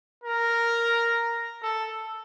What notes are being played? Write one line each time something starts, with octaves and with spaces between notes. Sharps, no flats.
A#4
A4